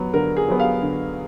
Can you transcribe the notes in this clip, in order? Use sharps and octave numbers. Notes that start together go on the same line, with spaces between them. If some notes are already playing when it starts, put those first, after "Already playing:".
Already playing: F#3 B3
D3 A#4
G#4
F#3 B3
F5
D3